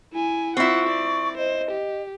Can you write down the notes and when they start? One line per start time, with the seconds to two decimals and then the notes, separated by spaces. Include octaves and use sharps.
0.13 E4 G#5
0.57 C4 E4 F4 F#5 C#6
0.88 D5
1.37 C5 D#5
1.71 G4